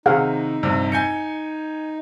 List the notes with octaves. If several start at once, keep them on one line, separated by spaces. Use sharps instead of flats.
C3 D#3 D#4 G#4 F5 F#5
A#1 G2 C3
G#5 G6 C#7